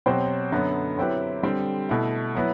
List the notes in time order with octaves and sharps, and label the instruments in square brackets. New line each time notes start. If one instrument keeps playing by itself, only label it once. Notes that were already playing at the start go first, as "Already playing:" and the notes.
[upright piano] B2 F#3 C4 G4 C5
F#2 D3 F#3 B3
F#3 C4 E4 G4 B4
D3 G3 C4
B2 A3 E4
F#3 B3 E4 B4